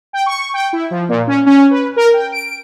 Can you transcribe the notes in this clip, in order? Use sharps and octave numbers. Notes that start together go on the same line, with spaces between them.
G5
C#6
G5
E4
F3
A#2
C#4
C#4
B4
A#4
G5
D7